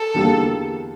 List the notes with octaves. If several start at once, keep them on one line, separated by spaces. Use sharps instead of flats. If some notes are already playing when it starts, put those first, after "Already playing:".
Already playing: A4
E2 D3 G3 A#3